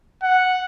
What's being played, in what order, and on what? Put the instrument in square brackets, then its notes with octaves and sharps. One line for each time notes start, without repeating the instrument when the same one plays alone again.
[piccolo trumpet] F#5